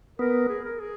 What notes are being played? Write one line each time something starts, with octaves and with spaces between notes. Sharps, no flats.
B3 A#4
G#4
A#4
G#4